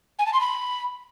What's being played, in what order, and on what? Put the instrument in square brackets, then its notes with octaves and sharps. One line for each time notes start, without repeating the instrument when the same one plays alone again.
[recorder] G#5
A5
C6
B5